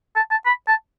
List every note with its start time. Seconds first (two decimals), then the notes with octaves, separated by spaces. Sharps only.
0.16 A5
0.31 A5
0.46 B5
0.68 A5